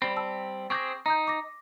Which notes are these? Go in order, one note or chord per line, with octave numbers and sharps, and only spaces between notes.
G3 C4 B5
A5 E6
C4 G#4 C#6 D6 G6 A#6
D#4 A#5 D#6 G6
D6 A#6